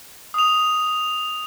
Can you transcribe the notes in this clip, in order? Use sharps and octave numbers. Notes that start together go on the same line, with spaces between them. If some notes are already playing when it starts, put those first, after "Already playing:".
D#6 F7